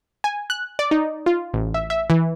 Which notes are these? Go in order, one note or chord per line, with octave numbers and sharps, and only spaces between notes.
G#5
F#6
D5
D#4
F4
A1
E5
E5
E3